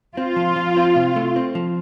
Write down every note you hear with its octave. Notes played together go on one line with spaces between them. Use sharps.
C4 F4
F3
F3
C4
C3
A3
C4
F3